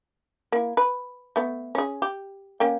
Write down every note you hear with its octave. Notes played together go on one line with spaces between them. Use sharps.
A#3 E4
B4
A3 B3
C#4 G#4
G4
A#3 C#4 G5